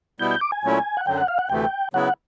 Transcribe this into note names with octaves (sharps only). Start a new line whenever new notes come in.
B2 G3 B3 E4 G6
G6
D6
G#5
A#2 F#3 A3 C#4 E4
F#5
F#2 D3 F#3 G5
F#5
F5
F#5
D2 C3 E3 A3 G5
C#3 F#3 B3 E4 F#5